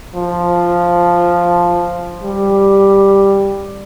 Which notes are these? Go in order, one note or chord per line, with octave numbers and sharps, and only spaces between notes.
F3
G3